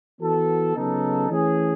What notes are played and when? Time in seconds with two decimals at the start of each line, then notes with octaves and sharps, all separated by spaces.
0.20 E3 B3 F#4 A4
0.75 C#3 F#3 B3 D#4 A4
1.30 E3 A3 C#4 G#4